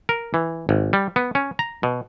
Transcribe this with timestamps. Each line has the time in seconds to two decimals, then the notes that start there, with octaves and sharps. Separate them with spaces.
0.09 A#4
0.34 E3
0.69 G#1
0.93 G3
1.16 B3
1.35 C#4
1.59 A#5
1.83 B2